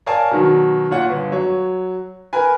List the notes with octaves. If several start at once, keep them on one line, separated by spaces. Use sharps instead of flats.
A#4 C#5 D5 F5 G#5 A5
B2 D#3 F#3
A#2 C#5 F#5
G1
F#3 C#5
A#4 B4 G#5